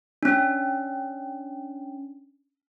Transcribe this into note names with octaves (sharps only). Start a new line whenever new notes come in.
C#4 D4